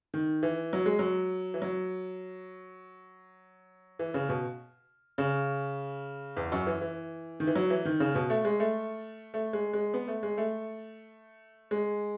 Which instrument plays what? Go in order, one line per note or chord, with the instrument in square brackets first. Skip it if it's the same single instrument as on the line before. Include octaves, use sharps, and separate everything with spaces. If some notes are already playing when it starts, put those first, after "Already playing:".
[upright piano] D#3
E3
F#3
G#3
F#3
E3
F#3
E3
C#3
B2
C#3
E2
F#2
E3
E3
D#3
E3
F#3
E3
D#3
C#3
B2
A3
G#3
A3
A3
G#3
G#3
B3
A3
G#3
A3
G#3